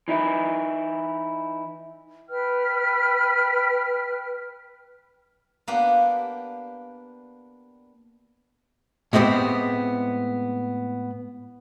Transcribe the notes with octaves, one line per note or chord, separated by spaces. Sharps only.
E3 D#4 E4
B4 G5 F6
A#3 B3 D4 G4
A2 G#3 A3 B3 C4 G4